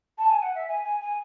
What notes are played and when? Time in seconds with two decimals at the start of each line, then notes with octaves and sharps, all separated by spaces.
0.18 A5
0.30 G#5
0.42 F#5
0.55 E5
0.68 G#5
0.85 G#5
1.01 G#5